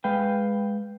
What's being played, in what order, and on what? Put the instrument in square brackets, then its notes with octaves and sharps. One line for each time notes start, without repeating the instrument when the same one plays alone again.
[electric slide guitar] G#3 B4 F5 G5